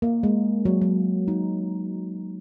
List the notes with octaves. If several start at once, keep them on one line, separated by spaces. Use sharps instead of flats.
A#3
G#3
F#3
F#3
D#4